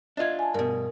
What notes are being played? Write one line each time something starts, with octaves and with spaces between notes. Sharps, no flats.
D4 F4 D#5 E5 G#6
G#5 A5
G2 B2 A#4